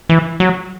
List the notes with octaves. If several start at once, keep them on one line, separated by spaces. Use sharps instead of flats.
E3
F#3